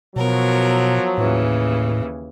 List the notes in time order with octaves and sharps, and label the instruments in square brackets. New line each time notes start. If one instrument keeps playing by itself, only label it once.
[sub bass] B2 [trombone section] F3 F#3 [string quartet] B3 A#4
[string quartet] D#2 C#3 E3 [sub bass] A2